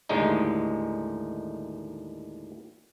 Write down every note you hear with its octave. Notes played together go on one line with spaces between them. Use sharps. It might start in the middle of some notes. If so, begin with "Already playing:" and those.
D#2 A2 D3 G#3 D#4